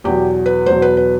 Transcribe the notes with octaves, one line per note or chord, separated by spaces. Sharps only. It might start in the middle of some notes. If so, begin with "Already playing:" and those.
E2 B2 F#3 G4
B4
E2 B2 F#3 C5
B4
B4